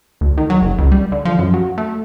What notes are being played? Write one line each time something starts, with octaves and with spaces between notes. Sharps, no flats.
D2
D#3
F#3
F#1
C#2
G3
D3
F3
F#2
F#3
A3